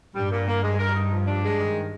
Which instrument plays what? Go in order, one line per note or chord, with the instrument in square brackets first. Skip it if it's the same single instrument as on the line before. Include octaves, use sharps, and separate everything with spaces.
[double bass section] G2 [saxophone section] G3
[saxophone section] A#2
A#3
G#3
A#4
D#4
F3
D4
G#3
D#3